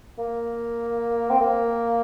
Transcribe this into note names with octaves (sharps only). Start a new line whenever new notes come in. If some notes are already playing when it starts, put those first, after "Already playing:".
A#3
C4
A#3